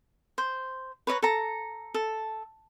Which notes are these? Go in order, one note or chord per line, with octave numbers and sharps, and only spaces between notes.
C5
B4 C#5 D#5 A#5
A4 A#5
A4